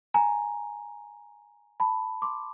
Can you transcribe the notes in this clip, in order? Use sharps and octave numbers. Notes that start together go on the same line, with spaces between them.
G#5 A#5
A5 B5
C6 D6